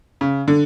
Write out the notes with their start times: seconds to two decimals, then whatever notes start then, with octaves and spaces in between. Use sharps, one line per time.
0.21 C#3
0.48 D3